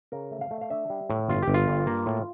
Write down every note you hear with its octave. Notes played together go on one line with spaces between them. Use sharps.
C#3 A#4
A3
F5
A3
F5
D4 E5
G3
A2
G1 F4
G4
G1
F4
G2
A#3
A2